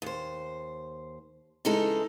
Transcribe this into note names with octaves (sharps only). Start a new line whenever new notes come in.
D#2 C5
C#3 E3 G#3 D#4 A4